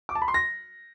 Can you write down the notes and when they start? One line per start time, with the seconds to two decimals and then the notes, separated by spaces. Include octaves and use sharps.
0.09 D6
0.15 A5
0.22 B5
0.28 C6
0.34 A#6